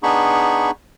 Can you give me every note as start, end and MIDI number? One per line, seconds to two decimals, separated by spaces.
0.03 0.71 59
0.03 0.71 62
0.03 0.71 63
0.03 0.71 68
0.03 0.71 83
0.03 0.71 85